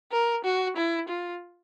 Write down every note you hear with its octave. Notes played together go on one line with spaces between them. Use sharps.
A#4
F#4
E4
F4